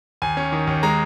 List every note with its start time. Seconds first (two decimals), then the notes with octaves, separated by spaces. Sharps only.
0.22 D#2 G#5
0.37 C#4
0.52 D#3
0.67 D#2
0.83 G#3 A#5